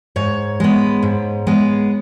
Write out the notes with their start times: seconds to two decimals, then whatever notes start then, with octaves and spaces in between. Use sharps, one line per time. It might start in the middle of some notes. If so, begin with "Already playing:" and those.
0.16 G#2 C#5
0.60 G#3 B3
1.02 G#2
1.47 G#3 B3